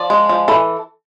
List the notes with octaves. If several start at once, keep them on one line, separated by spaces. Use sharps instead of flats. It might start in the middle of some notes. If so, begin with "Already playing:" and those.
Already playing: F3 D5
G#3
F3
E3 A4